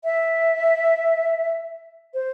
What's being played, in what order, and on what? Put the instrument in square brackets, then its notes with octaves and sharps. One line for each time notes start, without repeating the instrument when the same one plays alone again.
[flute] E5
C5